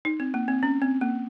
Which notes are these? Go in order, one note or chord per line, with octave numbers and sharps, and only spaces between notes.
D#4
C4
A#3
C4
C#4
C4
A#3